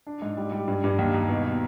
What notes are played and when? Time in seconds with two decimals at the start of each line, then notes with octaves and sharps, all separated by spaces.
0.07 D4
0.22 G#2
0.37 G3
0.52 G3
0.68 G2
0.84 G2
0.99 D#2
1.14 D#2
1.29 B2
1.44 B2